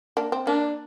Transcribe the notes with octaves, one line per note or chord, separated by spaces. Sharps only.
A#3 D4
C4
A#3 D4